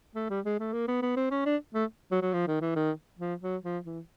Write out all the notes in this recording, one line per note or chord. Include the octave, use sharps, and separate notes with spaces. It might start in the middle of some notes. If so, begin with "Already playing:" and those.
A3
G3
G#3
A3
A#3
B3
B3
C4
C#4
D4
A3
F#3
F#3
F3
D#3
E3
D#3
F3
F#3
F3
E3